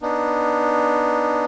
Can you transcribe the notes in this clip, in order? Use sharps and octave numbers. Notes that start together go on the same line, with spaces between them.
B3 D4 D#4